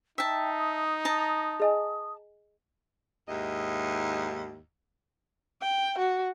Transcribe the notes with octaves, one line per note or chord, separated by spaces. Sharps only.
D#4 E5 G5 A5
D#6
A5 A#5
G#4 D#5 G#5
D#2 G#2 E4 D#5
G5
F#4